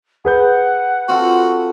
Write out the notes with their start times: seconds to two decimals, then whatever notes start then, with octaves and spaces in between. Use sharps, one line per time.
0.25 G#4 B4 F#5 G6
1.09 C4 F4 F#4 A4